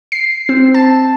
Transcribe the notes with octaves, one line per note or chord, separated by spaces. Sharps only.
C7
C4
A5